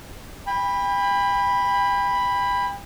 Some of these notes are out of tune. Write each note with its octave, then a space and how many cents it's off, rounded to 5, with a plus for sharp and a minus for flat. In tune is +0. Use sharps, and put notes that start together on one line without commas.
G5 +40 B5 +0